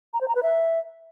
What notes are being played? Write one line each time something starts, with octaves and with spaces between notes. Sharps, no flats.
A#5
C5
A#5
B4
E5